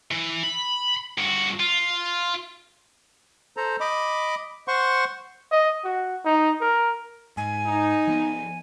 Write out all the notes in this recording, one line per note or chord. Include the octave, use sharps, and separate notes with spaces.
E3
B5
G2 F#4
F4
A4 C5 A#5
D#5 B5 D6
C5 F#5 C6 C#6
D#5
F#4
D#4
A#4
G#2 G#5
D#4
F3 B3